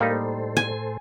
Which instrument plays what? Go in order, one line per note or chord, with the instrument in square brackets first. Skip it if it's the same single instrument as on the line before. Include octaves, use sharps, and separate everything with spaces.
[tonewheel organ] A2 A4 C5 [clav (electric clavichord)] G3 D#4 [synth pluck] A#3
[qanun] G#5